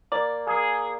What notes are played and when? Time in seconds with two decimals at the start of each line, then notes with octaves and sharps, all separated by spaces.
0.12 A#3 D5
0.47 A#3 G#4